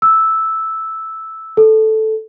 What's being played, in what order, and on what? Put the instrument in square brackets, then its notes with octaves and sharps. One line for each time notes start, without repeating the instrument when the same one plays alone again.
[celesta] E6
A4